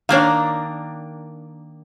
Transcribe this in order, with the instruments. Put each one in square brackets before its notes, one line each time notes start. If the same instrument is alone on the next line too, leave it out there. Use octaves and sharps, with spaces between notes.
[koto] D#3 A#3 D4 [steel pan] C#5 F5